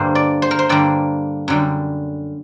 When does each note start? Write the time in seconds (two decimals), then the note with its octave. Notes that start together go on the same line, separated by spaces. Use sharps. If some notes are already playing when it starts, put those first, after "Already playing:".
Already playing: G2 D3 G3 A#3 C5
0.15 D5
0.42 C5
0.51 A#4
0.59 C5
0.69 G2 D3 G3 A#3 D5
1.48 F#2 D3 G3